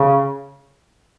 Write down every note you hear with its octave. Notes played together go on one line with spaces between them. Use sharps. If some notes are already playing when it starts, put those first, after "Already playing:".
Already playing: C#3